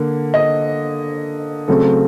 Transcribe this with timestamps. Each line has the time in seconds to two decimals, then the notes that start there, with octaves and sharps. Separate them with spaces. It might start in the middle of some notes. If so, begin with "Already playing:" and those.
Already playing: D3 A#3
0.34 D#5
1.68 C#3 F#3 A3 C4 A4